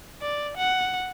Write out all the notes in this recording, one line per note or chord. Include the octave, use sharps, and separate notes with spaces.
D5
F#5